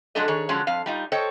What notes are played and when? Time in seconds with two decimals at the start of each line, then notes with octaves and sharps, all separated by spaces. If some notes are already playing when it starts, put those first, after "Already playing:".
0.15 F3 F#3 G#3 D4 A4 D#5
0.28 D#3 G#4 C#5
0.49 D3 F3 F#3 G#3 C#4
0.67 F2 F5
0.86 G3 D#4 F4
1.12 A4 C5 C#5 D#5 G5